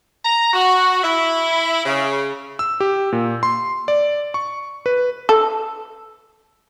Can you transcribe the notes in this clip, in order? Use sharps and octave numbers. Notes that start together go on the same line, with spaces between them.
A#5
F#4
E4
C#3
E6
G4
A#2
C6
D5
C#6
B4
A4